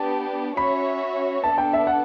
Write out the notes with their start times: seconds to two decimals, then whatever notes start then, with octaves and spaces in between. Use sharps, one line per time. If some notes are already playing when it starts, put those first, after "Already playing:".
Already playing: B3 D4 G4 A5
0.56 C#4 F#4 C#5 E5 B5
1.43 B3 D4 A4 A5
1.58 G5
1.73 E5
1.87 F#5